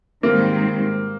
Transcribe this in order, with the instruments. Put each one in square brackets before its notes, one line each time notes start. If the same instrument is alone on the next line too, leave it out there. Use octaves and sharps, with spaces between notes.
[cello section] G#2 D#3 G3 C4 [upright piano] A#3